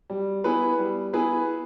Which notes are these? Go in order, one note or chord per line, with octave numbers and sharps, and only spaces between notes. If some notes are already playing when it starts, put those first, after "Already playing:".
G3
B3 E4 G#4 B4
G3
B3 E4 G#4 B4